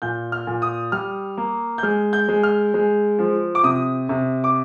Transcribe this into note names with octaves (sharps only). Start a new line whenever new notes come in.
A#2 G6
F6
A#2
D#6
G3 F6
A#3
G6
G#3 F6
G6
G#3
F6
G#3
F3
D6
C3 D#6
C3
D6